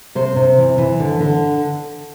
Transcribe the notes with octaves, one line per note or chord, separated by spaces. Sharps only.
C3 C5
C3
E3
E3
D3
D3